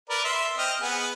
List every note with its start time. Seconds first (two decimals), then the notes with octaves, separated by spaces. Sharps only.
0.10 A#4 B4 D5
0.24 E5 C6
0.58 C4 D#5 F6
0.82 B3 G#4